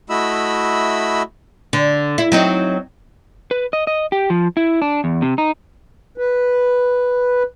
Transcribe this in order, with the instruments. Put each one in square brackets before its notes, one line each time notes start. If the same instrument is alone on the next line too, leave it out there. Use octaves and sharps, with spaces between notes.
[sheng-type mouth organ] A3 E4 F#4 D#5 B5 E6
[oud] D3
E4
F#3 C4 D#4
[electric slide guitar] B4
D#5
D#5
G4
F3
E4
D4
E2
C3
D#4
[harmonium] B4